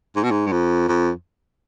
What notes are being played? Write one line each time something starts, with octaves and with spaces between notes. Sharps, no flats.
G#2
B2
G#2
G2
F2
F2